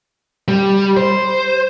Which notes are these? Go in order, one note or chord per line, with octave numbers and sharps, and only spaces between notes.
G3
C5